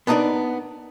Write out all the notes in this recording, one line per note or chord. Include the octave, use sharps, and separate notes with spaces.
B3 D4 D#4 G4 A#4 D5